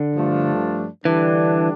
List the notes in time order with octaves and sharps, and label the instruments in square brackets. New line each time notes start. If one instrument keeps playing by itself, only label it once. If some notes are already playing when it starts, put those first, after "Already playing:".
Already playing: [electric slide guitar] D3
[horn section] G2 F3 A3 D4 F4
[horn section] D3 G3 D4 [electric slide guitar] E3